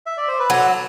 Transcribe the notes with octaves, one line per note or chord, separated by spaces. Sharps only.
E5
D5
C5
B4
F#3 A4